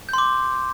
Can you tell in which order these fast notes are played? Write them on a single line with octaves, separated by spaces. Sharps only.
G6 C6 D6